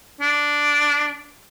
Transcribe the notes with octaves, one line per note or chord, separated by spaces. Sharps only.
D4